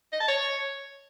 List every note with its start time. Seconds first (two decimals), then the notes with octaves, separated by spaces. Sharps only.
0.12 D#5
0.20 A5
0.28 C#5